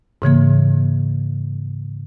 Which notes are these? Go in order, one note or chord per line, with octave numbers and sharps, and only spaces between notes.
G#2 C#3 E3 A#3